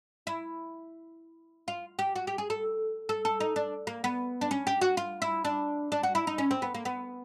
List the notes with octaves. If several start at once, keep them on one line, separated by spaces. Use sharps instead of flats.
E4
F4
G4
F#4
G4
G#4
A4
A4
A4
D#4
D4
A#3
B3
D4
C#4
G4
F#4
F4
E4
D4
D4
F#4
E4
D#4
C#4
C4
B3
A#3
B3